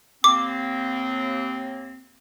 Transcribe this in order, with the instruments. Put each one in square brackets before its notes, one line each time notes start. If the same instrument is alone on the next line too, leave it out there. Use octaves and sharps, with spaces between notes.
[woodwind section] D#2 A#3 C4 [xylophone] D6